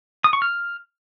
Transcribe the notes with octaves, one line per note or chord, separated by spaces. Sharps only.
D#6
C#6
F6